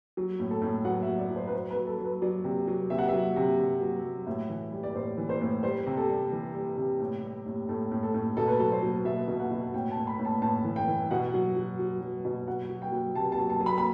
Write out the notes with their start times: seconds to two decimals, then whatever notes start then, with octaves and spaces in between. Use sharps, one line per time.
0.17 F#3
0.40 A2
0.51 A4
0.62 A2
0.85 F#3 F#5
1.02 E5
1.08 F#3
1.19 D5
1.31 F#3
1.36 C5
1.47 B4
1.53 F#3 C5
1.71 B4
1.76 F#3
1.87 A4
1.99 F#3
2.04 B4
2.22 F#3 D5
2.44 C3
2.67 F#3
2.90 C3 E5
2.98 F#5
3.08 F#3 E5
3.36 C3
3.59 C3
3.81 F#3
4.04 F#3
4.27 A2 E5
4.49 E3
4.72 G3
4.83 D5
4.95 A2 C5
5.18 E3
5.29 C5
5.41 A2
5.63 G3 C5
5.87 C3
5.97 A4
6.09 G3
6.32 E3
6.54 G3
6.78 C3
7.00 A2
7.24 G3
7.46 A2
7.69 A2 A4
7.92 A2
8.03 A4
8.14 A2
8.37 B2 A4
8.48 B4
8.59 F#3 A4
8.71 C5
8.83 F#3
9.05 B2 E5
9.28 B2
9.40 F#5
9.51 B2
9.74 A2 G5
9.91 A5
9.97 A2
10.07 B5
10.19 A2
10.25 A5
10.42 A2 A5
10.64 E3
10.76 G5
10.87 E3
11.11 B2 F#5
11.34 F#3
11.56 F#3
11.79 F#3
12.01 F#3
12.25 B2
12.48 F#3 F#5
12.70 F#3
12.82 G5
12.92 F#3
13.15 C3 A5
13.32 A5
13.38 F#3
13.50 A5
13.60 F#3
13.66 B5
13.78 B5